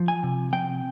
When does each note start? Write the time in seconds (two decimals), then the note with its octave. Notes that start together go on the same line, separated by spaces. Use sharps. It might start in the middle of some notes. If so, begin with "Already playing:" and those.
Already playing: F3
0.08 G#5
0.23 C3
0.53 C4 G5